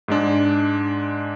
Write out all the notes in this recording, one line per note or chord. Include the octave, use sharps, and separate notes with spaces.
G#2 G#3 D4